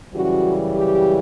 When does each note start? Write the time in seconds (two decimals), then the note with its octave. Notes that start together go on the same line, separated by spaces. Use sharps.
0.14 F#2 C#3 E3 G3 F#4
0.73 G4